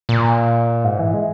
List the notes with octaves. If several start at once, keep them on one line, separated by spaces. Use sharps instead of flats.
A#2
G#2
E3
G#3